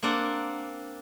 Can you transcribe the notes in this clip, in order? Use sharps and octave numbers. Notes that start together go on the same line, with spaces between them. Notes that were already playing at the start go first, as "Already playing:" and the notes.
A#3 C4 D4 D5 F#5